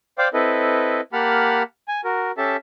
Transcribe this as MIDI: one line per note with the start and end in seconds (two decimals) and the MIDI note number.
0.18 0.28 72
0.18 0.28 74
0.18 0.28 77
0.18 0.28 79
0.18 0.28 86
0.34 1.01 60
0.34 1.01 64
0.34 1.01 69
0.34 1.01 71
0.34 1.01 75
1.13 1.63 58
1.13 1.63 67
1.13 1.63 78
1.13 1.63 81
1.13 1.63 83
1.13 1.63 89
1.88 2.01 80
2.04 2.31 66
2.04 2.31 70
2.38 2.57 61
2.38 2.57 67
2.38 2.57 69
2.38 2.57 76
2.38 2.57 81